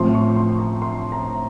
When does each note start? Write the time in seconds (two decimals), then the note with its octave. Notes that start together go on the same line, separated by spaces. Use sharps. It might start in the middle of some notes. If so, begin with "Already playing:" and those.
Already playing: A2 F3 C4 C6
0.14 C#6
0.36 C6
0.59 A#5
0.82 C6
1.12 A#5